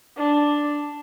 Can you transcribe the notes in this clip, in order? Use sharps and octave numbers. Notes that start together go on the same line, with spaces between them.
D4